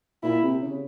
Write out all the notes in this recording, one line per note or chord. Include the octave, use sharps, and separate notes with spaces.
A#2 E4
C3
C#3